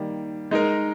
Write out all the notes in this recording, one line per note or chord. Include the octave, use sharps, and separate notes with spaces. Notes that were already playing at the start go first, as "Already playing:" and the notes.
Already playing: D#3 G3 A#3
G#3 D#4 A#4